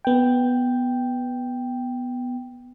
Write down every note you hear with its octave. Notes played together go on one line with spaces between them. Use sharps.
B3 G5